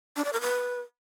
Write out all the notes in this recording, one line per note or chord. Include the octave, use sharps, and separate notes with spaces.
D4
D5
A#4
B4